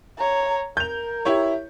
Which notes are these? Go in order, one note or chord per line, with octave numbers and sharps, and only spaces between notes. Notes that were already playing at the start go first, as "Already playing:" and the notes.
C#5 A#5
A#4 G6 F7
E4 G4 C#5